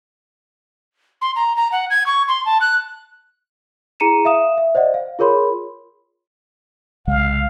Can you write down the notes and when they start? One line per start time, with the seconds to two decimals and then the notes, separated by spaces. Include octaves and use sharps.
1.21 C6
1.36 A#5
1.56 A#5
1.72 F#5
1.90 G#6
2.06 C#6
2.28 C6
2.46 A5
2.61 F#6
4.00 E4 G#4 A#5 C#7 D#7 E7
4.25 E5 F5 D#6 E7
4.57 E5
4.75 C5 D5 D#5 F#5
4.94 F5
5.19 F4 G#4 A#4 C#5 B5 C6
7.07 C2 C#3 G#3 F5